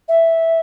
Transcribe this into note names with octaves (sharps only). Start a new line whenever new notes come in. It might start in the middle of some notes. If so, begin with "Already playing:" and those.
E5